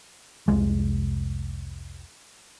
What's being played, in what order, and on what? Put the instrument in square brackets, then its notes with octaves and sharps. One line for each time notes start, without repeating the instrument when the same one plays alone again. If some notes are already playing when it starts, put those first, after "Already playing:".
[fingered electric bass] F1 C2 G#3